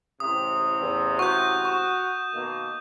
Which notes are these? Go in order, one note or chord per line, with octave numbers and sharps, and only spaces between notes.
A1 C3 D#6
E2
F#4 C#6 G6
C#6 E7
B2 D#3 A#3